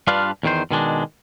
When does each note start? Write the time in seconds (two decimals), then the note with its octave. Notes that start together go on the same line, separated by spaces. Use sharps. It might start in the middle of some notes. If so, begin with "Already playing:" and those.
0.07 G2 D4 F4 B4 F5
0.43 E2 D#3 C5
0.71 B2 D#3 G#3 D4